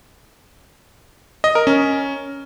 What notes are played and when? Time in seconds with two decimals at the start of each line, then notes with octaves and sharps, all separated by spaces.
1.44 D#5
1.55 A#4
1.67 C#4